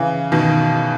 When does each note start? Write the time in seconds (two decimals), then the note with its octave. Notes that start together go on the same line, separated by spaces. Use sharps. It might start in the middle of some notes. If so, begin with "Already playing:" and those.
Already playing: C#3 E3
0.32 B2 D#3